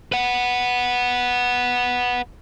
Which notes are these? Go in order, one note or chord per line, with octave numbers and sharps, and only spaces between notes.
B4 F#5